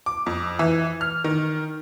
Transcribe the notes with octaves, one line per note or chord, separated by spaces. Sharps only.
D6
F2
E3
F6
D#3